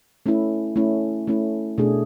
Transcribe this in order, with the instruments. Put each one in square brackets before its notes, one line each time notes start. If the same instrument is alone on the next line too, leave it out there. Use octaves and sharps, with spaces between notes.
[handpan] A3 C#4 E4
A3 C#4 E4
A3 C#4 E4
B2 A3 D4 G#4